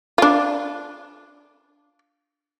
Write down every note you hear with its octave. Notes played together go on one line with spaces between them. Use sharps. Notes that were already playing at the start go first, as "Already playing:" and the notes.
D4 F4